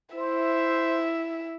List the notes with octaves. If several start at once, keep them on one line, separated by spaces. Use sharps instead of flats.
E4 C5 E5